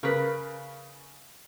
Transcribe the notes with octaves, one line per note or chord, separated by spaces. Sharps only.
C#3 A#4 B4